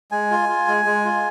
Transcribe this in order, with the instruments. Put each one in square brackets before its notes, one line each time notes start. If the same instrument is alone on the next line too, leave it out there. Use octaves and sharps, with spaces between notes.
[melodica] G#3 G#5
F4
F4
G#3
G#3
F4